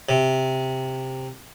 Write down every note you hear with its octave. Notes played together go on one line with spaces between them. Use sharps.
C3